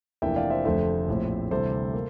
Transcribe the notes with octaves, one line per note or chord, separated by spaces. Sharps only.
F1 F2 E3 A#3 D4 E5 G5
D5 F5
C5 E5
F1 F2 D3 A3 C5 E5
A#1 A2 F3 C4
D2 C3 E3 G3 A4 C5
A#3